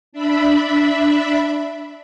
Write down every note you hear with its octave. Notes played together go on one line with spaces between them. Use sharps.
D4 E5 B5